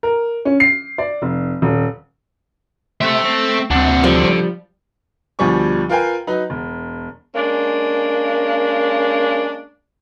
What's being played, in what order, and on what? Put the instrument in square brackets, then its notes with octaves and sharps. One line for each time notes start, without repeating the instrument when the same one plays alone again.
[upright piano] A#4
C#4
C7
D5
F1
D#1
[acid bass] A3 [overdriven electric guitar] G4 C5 [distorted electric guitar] A4 E5
[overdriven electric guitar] C4
[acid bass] D2 [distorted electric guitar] C4 D4 [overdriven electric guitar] F#5
[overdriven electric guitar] D3 [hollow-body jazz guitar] F3 G3
[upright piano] D2 B2 F3 G3 G#5 C#6
F4 A#4 B4 F5 G5 G#5
F#3 D#4 B4
E1
[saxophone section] G#3 A#3 C#4 D4